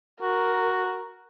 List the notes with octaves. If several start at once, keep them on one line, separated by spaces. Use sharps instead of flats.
F#4 A#4